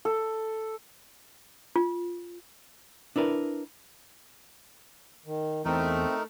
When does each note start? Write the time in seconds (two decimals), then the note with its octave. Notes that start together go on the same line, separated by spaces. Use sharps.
0.05 A4
1.76 F4
3.16 D4 E4 A#4 B4
5.26 D#3
5.65 E2 A3 C4 D#4 A#4